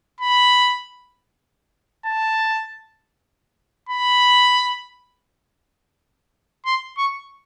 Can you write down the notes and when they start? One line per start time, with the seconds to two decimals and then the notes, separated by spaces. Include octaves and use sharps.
0.21 B5
2.05 A5
3.89 B5
6.66 C6
6.98 C#6